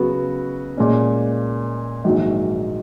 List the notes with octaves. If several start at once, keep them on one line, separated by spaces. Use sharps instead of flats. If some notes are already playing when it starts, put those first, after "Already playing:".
Already playing: C#3 F#3 B3 F#4
A#2 G#3 C#4
A#1 G#2 D#3 F#3